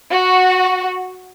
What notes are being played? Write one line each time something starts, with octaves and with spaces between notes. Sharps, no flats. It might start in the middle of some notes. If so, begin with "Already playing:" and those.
F#4